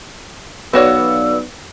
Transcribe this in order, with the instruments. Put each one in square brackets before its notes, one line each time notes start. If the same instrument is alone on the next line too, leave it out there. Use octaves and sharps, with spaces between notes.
[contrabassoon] B1 [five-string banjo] B3 F#4 C#5 [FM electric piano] B4 D5 F5 [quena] E6